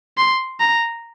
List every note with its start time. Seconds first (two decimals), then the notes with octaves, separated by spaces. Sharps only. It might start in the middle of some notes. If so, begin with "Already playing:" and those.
0.17 C6
0.60 A#5